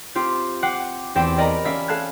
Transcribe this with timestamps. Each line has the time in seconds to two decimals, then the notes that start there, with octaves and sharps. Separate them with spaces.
0.15 C4 F4 G4
0.63 F#5 G5 D6 F#6 C7
1.15 E2 C4 G4 G5 D6 E7
1.37 A#4 D5 D#5 G5 A#5 B5
1.65 C#4 D5 E5 F5 E6
1.88 A4 F5 A5 F#6 G#6